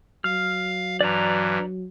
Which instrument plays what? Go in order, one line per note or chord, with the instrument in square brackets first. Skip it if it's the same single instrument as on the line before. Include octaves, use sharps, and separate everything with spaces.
[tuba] F#3 [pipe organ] F5 [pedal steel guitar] F6
[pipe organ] G2 E3 [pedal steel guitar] D5 A#5